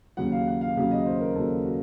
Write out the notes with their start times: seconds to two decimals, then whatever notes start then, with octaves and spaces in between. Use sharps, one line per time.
0.17 D#2 C#3 F#3 F#5
0.32 F5
0.48 F#5
0.61 F5
0.76 D#2 C#3 F#3 F5
0.91 D#5
1.06 C5
1.21 A#4
1.35 D#2 C#3 F#3 A4
1.65 F#4